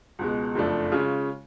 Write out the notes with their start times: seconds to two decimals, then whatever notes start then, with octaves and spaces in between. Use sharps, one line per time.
0.19 C#2 B2 G#3
0.55 F#1 F2 F3 A3 D4
0.92 C#3 G#3 C#4 F4